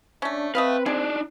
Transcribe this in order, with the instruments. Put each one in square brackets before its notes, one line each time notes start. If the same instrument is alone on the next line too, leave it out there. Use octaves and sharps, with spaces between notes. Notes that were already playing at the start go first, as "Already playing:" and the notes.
[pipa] A3 C#4 [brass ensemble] D4
[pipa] A3 D#5 F5 [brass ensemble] C4 [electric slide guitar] B4
[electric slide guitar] D4 D#4 D5 [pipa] G#4